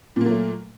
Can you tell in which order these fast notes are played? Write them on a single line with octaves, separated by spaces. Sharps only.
A#2 A#3 F#3 A3